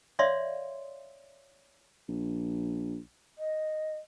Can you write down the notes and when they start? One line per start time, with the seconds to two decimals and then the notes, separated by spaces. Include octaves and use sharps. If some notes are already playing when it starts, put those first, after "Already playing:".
0.19 C#5 D5 E5 F5 C6
2.09 A#1
3.38 D#5